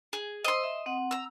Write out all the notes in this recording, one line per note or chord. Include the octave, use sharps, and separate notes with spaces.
G#4
C5 D#5 C6 D#6 E6
E5
C4 F#5
A#5 E6